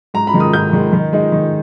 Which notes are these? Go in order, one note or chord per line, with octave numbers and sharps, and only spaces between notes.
G#2 A#5
B5
D#3 G#3
D#6
G#2 G6
D#3 G#3
D#3
G#3 D#4
D#3